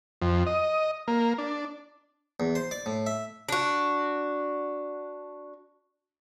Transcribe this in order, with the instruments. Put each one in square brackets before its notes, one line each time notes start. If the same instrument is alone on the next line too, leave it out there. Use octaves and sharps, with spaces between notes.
[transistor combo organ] F2
D#5
A#3
D4
[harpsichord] E2
C5
D5
A2
E5
[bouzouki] D4 F#4